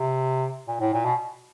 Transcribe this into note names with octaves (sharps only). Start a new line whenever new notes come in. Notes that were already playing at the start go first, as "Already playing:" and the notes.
Already playing: C3
A#2
A2
A#2
B2